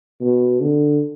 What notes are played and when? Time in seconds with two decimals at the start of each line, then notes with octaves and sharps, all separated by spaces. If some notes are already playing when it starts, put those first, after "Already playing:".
0.21 B2
0.61 D3